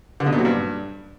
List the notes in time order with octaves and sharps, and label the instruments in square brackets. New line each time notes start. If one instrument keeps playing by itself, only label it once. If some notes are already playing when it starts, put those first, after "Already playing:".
[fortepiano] D3
B2
A#2
F#3
G2